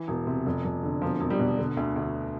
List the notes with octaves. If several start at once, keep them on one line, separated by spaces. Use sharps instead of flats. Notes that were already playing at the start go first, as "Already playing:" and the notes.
Already playing: E3
E1
C3
F1
F1
D3
E1 F3
E1
G3
B2
D3
D2
D2